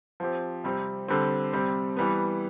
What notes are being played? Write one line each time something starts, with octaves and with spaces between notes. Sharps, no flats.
F3 C4 G4
C3 G3 C4
D3 G3 C4
C3 G3 C4 G4
E3 G3 B3